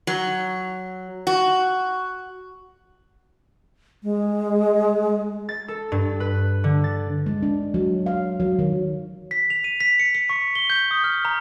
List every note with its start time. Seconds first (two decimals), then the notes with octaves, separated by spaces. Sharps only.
0.07 F#3
1.27 F#4
4.03 G#3
5.49 A6
5.68 A4
5.92 G2
6.20 B4
6.64 D3
6.84 A6
7.26 G#3
7.43 D4
7.74 F#3
8.06 F5
8.40 F#3
8.59 D#3
9.31 B6
9.50 F7
9.64 D#7
9.81 B6
9.99 C#7
10.15 C#7
10.30 C#6
10.55 G7
10.70 G6
10.91 D#6
11.04 F6
11.25 A#5